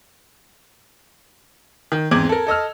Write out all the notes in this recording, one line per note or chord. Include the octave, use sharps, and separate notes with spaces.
D#3
E2 G#2 C4 D6 G#6 F#7
A4 A#4
A4 D#5 E6 F6